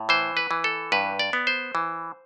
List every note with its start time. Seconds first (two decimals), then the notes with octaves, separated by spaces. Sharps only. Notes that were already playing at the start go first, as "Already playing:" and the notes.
Already playing: A2
0.09 E3 C5
0.37 B4
0.51 E3
0.64 A4
0.92 G2 B4
1.19 D5
1.33 B3
1.47 C5
1.75 E3